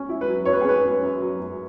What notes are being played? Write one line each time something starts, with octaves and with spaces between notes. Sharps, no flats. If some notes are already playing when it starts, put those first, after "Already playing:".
Already playing: C#4
E4
B4
F#3
F#2 C#5
B4
G#4
C#4 B4
F#2
F#2
F#3
F#2